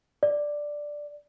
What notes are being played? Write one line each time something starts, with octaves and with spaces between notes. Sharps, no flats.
D5